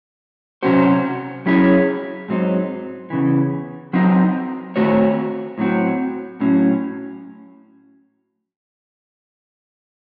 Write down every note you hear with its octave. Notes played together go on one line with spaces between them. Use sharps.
C3 F#3 C#4 F#4 C5
F#3 C#4 E4 G#4 C#5
G#2 F#3 C4 D#4
E2 C#3 E3
F#3 C4 D#4
D#3 A3 C4 F#4 C#5
A2 F#3 C4 F#4
A2 F#3 C#4